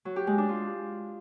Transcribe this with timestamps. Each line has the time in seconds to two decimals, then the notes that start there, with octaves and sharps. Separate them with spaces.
0.05 F#3
0.16 G4
0.27 G#3
0.38 D4
0.49 F4